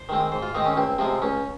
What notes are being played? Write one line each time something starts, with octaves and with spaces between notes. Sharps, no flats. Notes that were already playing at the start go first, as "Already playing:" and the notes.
Already playing: C5
D#3 G#3 C4
G#2 C5
F4
D#3 G#3 C4 D#4
C#4
C#2 C4
C3 F3 G#3 C4
C#2 C#4